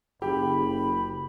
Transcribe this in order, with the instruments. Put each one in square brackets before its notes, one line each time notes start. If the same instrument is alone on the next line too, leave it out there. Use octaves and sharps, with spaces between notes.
[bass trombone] F#1 [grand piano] G4 [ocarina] B5